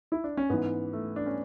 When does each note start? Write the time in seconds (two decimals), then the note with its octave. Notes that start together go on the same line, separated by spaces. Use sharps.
0.12 E4
0.24 D4
0.37 C#4
0.50 G#2 E3 B3
0.93 A3
1.16 D4
1.26 C#4